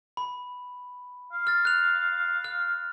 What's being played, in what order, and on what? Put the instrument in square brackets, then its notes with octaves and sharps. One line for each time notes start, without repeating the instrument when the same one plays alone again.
[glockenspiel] B5
[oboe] F5
[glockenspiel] F6 A6
F#6 F7
F6